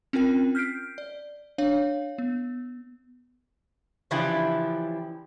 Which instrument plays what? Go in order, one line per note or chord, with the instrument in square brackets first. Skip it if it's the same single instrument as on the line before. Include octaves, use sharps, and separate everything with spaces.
[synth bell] C4 C#4 F4 A#4 G5
F6 G6 B6 C7 D7
D5
D4 C#5 F5
B3
[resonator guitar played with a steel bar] C#3 E3 F3 D4 E4 G4